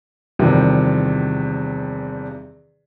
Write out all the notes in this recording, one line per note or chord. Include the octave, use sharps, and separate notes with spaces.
E2 G2 C3 D#3 F3